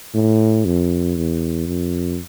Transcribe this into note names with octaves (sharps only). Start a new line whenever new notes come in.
A2
F2
E2
F2